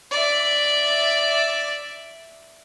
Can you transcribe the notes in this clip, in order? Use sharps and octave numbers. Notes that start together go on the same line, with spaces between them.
D5 E5